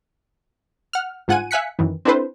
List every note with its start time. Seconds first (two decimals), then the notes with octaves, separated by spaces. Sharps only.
0.93 F#5 F6
1.28 G1 G#2 F4 F#5 G#5 D#7
1.51 E5 F5 G#5 F#6 B6 C#7
1.79 F#2 D#3 E3
2.05 C4 D4 E4 A4 B4 C5